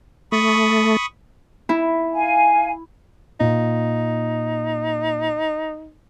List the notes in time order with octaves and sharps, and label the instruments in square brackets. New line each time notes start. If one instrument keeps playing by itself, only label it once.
[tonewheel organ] A3 [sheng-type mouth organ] B5 C#6 D#6
[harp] E4
[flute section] F5 G#5
[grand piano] A#2 [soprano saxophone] D#4